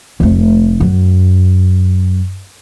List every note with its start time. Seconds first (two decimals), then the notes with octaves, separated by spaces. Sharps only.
0.20 F1 A3
0.80 F#2